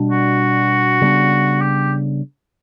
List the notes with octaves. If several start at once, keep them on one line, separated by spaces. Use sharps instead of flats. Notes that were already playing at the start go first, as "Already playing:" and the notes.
Already playing: B2 G3 D4
F#4
C#3 G3 B3 D4
G4